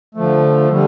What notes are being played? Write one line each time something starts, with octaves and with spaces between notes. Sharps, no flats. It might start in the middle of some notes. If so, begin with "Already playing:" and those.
D3 F3 A3
D3 G3